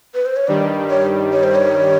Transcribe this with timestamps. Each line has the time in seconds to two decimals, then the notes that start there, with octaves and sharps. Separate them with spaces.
0.15 B4
0.26 C5
0.36 C#5
0.47 G2 D#3 G3 D5
0.90 C#5
1.33 C#5
1.43 C5
1.55 C#5